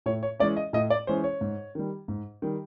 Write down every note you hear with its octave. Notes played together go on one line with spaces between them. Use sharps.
A2 C#5
C#5
E3 G#3 C#4 D5
D#5
A2 D#5
D5
E3 G#3 C#4 C5
C#5
G#2
D#3 G3
G#2
D#3 G3